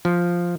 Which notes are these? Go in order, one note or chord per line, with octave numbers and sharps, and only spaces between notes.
F3